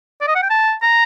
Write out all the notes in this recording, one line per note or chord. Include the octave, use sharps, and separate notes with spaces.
D5
D#5
F#5
G5
A5
A#5